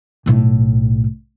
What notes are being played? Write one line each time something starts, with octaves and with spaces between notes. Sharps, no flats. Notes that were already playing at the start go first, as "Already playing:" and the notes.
B1 A2